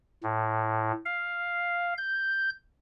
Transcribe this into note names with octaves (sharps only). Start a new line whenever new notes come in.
A2
F5
G6